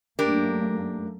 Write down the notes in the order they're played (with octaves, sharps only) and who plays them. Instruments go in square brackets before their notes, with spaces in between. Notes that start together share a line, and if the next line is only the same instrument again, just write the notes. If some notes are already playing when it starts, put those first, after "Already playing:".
[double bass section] F#2 A3 A#3 [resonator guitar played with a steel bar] D4 G4 A#4